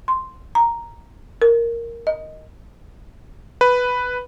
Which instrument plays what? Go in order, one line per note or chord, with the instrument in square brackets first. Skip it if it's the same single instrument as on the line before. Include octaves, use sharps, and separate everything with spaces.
[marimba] C6
A#5
A#4
D#5
[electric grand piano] B4